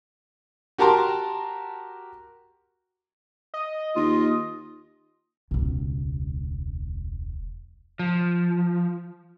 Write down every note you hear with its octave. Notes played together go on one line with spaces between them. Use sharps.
F#4 G4 A#4 A5 A#5 C6
D#5
D#2 F4
E1 C#2
F3